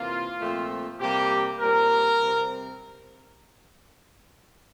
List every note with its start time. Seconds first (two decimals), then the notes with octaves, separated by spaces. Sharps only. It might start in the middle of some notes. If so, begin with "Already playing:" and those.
Already playing: C3 E3 A#3 F4
0.39 A#2 F3 A3 C4
1.00 C3 G3 A#3 G4
1.60 A#2 G3 C4 A#4
2.21 C3 G3 C4